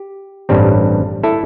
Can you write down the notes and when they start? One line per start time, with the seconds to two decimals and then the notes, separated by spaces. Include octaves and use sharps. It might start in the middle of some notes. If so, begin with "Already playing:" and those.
Already playing: G4
0.49 A1 G2 G3 C4
1.23 E4 A4